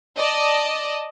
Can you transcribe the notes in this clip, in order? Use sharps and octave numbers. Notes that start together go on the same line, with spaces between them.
D5 D#5 A5